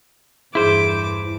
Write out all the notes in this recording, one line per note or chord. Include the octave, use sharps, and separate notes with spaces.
E2 G2 E4 G#4 C5 D6